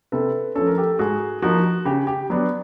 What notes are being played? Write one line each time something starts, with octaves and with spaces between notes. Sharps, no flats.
C3 A4 B4
F3 A3 C#4 A4
A#4
G4 A4
G#2 F#4 G#4
F3 A#3 D#4 F#4
C#3 G4
G4
F#3 B3 D4